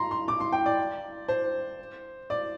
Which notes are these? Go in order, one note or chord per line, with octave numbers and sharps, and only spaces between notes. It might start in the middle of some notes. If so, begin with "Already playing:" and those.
Already playing: A#5 C6
C6
D6
C6
G5
D5
C5
D5